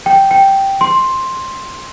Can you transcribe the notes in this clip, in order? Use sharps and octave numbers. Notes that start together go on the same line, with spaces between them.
G5
G5
C6